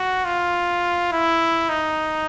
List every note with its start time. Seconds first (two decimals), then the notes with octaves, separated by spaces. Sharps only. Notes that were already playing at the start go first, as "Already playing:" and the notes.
Already playing: F#4
0.25 F4
1.12 E4
1.69 D#4